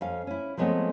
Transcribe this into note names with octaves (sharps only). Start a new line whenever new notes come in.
F2 C#4 F5
C#4 E4
F3 F#3 G#3 A3 B3 C4